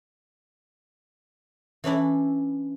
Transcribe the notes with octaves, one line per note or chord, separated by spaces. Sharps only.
E3 C#4 D4 E4